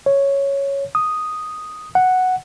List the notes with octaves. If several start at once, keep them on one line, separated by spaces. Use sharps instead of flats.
C#5
D#6
F#5